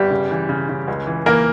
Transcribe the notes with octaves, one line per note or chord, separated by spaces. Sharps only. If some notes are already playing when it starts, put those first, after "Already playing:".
Already playing: G1 G3 G4
C#3
E3
C#3
C#3
C#2
E3
E3 A#3 A#4